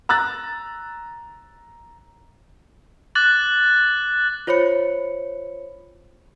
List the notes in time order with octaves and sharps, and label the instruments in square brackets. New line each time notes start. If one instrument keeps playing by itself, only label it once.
[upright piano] A#5 E6 F#6 A6
[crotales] D6 F#6 A6 F#7
[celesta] F4 C5 C#5 B5 C#7